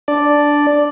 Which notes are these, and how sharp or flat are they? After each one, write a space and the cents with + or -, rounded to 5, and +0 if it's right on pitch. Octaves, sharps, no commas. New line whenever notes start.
D4 -5 D5 +0